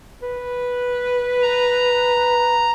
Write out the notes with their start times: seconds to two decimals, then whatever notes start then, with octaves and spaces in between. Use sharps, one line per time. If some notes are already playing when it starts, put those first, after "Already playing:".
0.22 B4
1.42 A#5